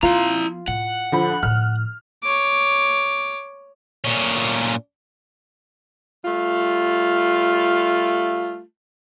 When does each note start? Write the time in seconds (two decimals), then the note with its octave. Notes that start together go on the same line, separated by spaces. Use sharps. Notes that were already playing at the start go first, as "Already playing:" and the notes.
0.03 F3 B3 E4 F4 A#5
0.68 A2 F#5
1.12 D3 F3 B5
1.43 A2 F3 F6
2.23 C#5 D6
4.04 A#2 C#4
6.25 G3 A3 F4